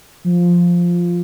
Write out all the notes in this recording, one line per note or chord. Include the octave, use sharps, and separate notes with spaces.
F3